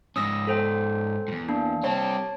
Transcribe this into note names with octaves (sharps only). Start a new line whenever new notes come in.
G#2 C#4 D#6 E6 A#6
A4 C5 G5
E2 G#2
A#3 D4
G3 C4 C#5 A5